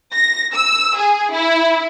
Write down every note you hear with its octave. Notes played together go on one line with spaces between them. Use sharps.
A#6
E6
G#4
E4